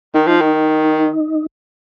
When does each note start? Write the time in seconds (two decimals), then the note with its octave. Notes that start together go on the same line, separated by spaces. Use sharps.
0.14 D#3 D#4
0.27 F3
0.41 D#3